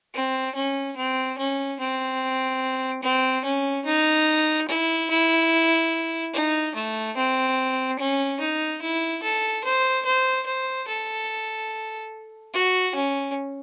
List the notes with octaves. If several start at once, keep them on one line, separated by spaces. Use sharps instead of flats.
C4
C#4
C4
C#4
C4
C4
C#4
D#4
E4
E4
D#4
A3
C4
C#4
D#4
E4
A4
C5
C5
C5
A4
F#4
C#4